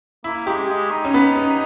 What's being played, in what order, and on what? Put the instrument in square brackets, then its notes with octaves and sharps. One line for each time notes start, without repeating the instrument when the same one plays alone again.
[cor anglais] A#3 [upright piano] E4
[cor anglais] G#3 [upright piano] G4
[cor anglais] G#3
D#4
[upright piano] C#4
B3
C#4